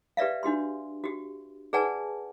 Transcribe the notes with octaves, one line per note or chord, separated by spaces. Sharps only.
G4 B4 D5 E5 F5
D4 F#4 G4 C6
F#4 G4
G#4 B4 D5 F#5 G#5 A5